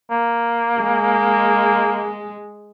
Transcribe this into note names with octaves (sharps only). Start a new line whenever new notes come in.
A#3
G#3